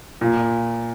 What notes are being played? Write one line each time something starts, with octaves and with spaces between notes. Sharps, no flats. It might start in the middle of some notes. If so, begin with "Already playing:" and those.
A#2